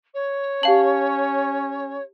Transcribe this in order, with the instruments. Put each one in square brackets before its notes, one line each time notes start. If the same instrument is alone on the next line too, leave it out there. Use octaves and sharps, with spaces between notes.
[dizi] C#5
[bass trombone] C#4 [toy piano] G4 A5 [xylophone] F5 F#7